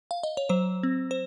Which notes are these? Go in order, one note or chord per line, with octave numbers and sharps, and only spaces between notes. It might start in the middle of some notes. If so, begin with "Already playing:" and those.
F5
D#5
C#5
F#3 C5
C4
C5